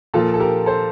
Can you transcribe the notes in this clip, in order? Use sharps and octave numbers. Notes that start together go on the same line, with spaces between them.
A#2 F3 F4 A4
A4
G4 A#4
A4 C5